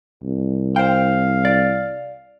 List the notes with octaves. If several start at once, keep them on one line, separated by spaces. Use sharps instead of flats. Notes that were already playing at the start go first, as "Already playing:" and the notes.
C2
C5 F5 G5
D5